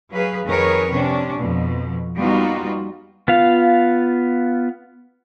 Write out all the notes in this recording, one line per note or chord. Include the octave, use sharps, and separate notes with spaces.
F#3 G#4 B4 F5
F2 D#3 G#4 A#4 B4 C#5
C3 C#4 D4
F2 B2
G3 A#3 B3 D#4 F4 F#4
B3 F4 F5